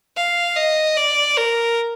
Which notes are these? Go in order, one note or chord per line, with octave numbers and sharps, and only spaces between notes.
F5
D#5
D5
A#4